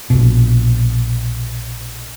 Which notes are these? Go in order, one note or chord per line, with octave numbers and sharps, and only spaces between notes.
A#1 B2